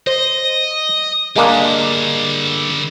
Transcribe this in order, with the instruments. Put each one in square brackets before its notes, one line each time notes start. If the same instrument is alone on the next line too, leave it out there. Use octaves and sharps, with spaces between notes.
[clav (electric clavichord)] C5 [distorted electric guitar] D#5
[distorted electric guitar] D3 G3 [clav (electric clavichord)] G#3 A#3 D4